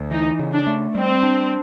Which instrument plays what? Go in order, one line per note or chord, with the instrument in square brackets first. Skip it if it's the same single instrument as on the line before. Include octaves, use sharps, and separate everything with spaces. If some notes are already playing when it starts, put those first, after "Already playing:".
Already playing: [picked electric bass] D2
[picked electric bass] E3 [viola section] D#4
[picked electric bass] C#3
[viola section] D4
[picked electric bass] A3
[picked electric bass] G3 [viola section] C4
[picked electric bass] D4